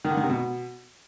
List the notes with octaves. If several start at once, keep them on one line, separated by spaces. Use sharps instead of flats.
D#3
D3
D#3
C3
B2